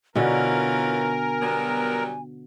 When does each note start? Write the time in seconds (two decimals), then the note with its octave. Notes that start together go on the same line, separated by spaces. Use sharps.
0.16 B2 D3 E3 C#4 F4 A#4 G#5
1.41 F#3 G3 B3